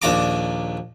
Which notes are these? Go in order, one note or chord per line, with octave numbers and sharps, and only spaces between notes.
A#1 D#2 D5 A#5 D6